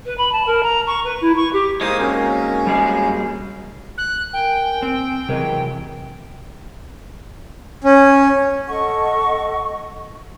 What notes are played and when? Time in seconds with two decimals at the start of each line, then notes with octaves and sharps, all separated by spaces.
0.05 B4
0.17 B5
0.32 A5
0.46 A#4
0.63 A#5
0.87 C#6
1.04 B4
1.21 E4
1.36 C#6
1.53 G4
1.81 G#3 A#3 D#4 C5 D#6
1.99 F#3 C4 C#4 A#4
2.67 G3 G#4
3.98 F#6
4.33 A#4 G5 G#5
4.82 C4
5.29 C3 E3 F#3 G#3 A#4 D#5
7.84 C#4
8.67 A4 D#5 F#5 C#6